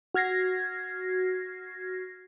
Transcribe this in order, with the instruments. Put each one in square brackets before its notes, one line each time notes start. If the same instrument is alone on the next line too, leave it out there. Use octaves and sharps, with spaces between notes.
[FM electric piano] F#4 F6 G#6 A#6 C7